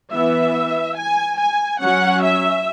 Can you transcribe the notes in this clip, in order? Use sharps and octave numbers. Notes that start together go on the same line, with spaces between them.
E3 B3 E5
G#5
G#5
F#3 C#4 F#5
E5